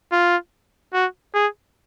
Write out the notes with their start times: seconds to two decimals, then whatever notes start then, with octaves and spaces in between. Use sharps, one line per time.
0.12 F4
0.94 F#4
1.34 G#4